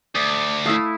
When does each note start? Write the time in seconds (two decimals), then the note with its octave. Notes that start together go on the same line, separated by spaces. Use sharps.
0.15 D2 D5 D#6
0.65 A3 E4 F5 D#6 E6